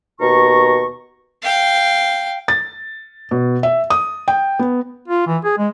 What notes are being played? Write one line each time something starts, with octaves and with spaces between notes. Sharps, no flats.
D#2 B2 A#5 C#6
F5 G5
A6
B2
E5
D#6
G5
B3
F4
E3
G#4
G#3